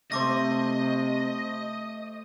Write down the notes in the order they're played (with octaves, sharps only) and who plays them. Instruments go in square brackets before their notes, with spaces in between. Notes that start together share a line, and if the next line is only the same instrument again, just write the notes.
[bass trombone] C3 [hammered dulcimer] A3 C5 [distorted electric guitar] D#5 [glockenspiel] D6 A#6